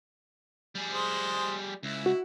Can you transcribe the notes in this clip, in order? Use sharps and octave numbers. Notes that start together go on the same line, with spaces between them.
G3 G#4
G#3 C5
C#2 E4
F#4